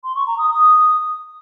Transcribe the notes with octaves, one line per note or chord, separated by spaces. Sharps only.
C6
C#6
A#5
D#6
D#6